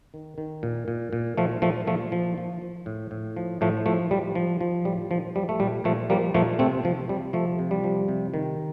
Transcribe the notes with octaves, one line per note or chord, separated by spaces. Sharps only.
D#3
D#3
A#2
A#2
A#2
A#2 F3 A3
A#2 F3 A3
A#2 F3 A3
F3
F3
F3
A2
A2
F3
A2 F3 A3
F3 A3
F3 G3
F3
F3
A2 G3
A#2 F3
F3 G3
A3
A#2 G3
A#2 F3 A3
F3 G3 A#3
A#2 F3 A3
C3 A3 C4
C3 F3
C3 G3
F3 A3
C3
G3
F3
C3
D#3